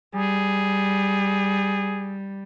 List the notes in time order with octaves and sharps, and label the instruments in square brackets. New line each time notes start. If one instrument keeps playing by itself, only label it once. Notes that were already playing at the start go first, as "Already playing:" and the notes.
[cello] G3 [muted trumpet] G#4